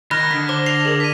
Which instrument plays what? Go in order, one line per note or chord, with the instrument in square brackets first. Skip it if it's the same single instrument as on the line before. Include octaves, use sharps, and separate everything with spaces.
[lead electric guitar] D#3 [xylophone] B5 F#6 [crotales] F6 G#6 A#6
[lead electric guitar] D3 [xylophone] B6
[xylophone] C5 [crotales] D6 G7
[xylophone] C7 [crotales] F7
[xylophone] G#4 A#4
[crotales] B6 D#7